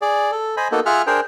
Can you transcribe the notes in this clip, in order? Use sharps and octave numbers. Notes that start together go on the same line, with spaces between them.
G#4 D5
A4
C5 D#5 G#5 B5
A#3 B3 D#4 F#4 A4
F4 G#4 E5 F#5 F6
D4 G#4 A#4 C5 G5